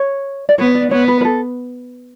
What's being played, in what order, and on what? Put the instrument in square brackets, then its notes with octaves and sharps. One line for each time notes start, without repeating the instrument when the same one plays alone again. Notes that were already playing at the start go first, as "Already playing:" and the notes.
Already playing: [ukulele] C#5
D5
[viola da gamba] B3 [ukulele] C#5
[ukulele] D5
[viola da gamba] B3 [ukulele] C#5
[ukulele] B4
B4
A4